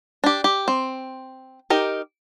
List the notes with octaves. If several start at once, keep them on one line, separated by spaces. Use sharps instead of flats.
D4 G4
G4
C4
D#4 G4 A#4